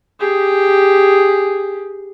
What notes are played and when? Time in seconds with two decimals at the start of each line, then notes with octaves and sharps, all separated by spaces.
0.20 G4 G#4